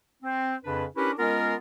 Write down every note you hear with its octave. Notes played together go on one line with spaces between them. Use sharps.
C4
F2 C#3 D4 B4
C#4 D4 E4 G4 A#4 B4
G#3 B3 C#4 F4 A#4